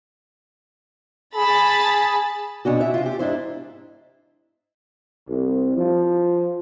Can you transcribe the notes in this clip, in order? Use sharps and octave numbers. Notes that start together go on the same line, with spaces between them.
G#4 A5 B5 A6
B2 C#4 D4 F#4
E4 E5
C3 F4
G4
G#2 D4 E4 C5
C2
F3